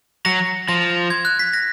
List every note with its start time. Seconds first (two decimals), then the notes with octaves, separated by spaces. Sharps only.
0.25 F#3 A#6
0.68 F3 A#6
1.10 G#6
1.25 F#6
1.39 B6
1.54 A#6